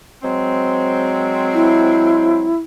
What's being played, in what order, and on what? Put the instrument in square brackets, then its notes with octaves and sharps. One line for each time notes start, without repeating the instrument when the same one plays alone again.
[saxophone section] F#3 G#3 C4
[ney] E4